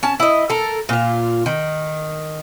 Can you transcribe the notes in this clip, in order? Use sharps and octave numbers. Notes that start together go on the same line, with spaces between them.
C#4 A5
E4 D#5
A4 A#4
A#2 F4
D#3